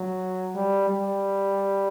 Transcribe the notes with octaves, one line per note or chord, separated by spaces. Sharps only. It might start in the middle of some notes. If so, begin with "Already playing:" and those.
Already playing: F#3
G3
G3